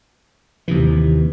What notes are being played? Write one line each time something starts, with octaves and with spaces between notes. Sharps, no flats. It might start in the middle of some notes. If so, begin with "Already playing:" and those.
D#2 C3 E3